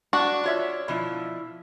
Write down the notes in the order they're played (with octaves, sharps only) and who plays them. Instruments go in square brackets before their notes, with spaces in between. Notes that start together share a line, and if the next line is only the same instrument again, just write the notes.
[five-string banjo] D4 F#4
[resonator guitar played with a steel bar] F4 C#5 E5
B2 F3 E4